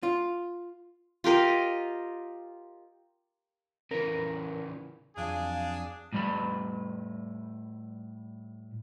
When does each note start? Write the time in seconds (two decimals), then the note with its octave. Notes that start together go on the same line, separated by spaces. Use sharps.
0.03 F4
1.24 F4 G4 A#4 D#5
3.91 C#3 E3 A#4
5.17 F2 F#3 D4 G#4 F5
6.13 A2 G3 B5